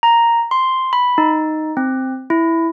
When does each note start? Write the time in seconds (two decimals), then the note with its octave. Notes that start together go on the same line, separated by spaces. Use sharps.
0.03 A#5
0.51 C6
0.93 B5
1.18 D#4
1.77 C4
2.30 E4